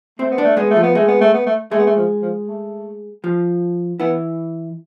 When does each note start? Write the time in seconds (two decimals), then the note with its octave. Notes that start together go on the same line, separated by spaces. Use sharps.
0.19 A3 C4 C5
0.32 B3
0.38 D4 D5
0.45 A3
0.57 G#3 B3 G#4
0.71 A3
0.76 F3 F4
0.83 B3
0.95 G#3 A3 G#4
1.08 B3
1.21 A3
1.34 B3
1.46 A3
1.71 G#3 A3 G#4
1.79 B3
1.87 A3
1.96 F3
2.22 F3
2.48 A3
3.24 F3 F4
4.00 E3 B3 E4